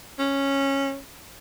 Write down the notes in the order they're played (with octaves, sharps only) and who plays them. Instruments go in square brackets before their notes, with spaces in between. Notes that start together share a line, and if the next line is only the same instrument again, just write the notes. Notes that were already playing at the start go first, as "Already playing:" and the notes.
[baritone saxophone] C#4